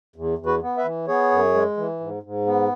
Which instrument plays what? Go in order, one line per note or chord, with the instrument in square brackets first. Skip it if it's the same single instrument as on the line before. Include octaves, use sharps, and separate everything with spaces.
[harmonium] E2
E2
F#4 B4
B3
B4 E5
E3
B3 G#4 C#5
F#2
G#3
E3
G#2
G#2
B3